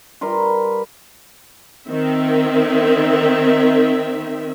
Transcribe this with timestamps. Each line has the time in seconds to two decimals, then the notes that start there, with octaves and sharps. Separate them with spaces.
0.21 G3 A#4 B4 C6
1.88 D#3 C4 E5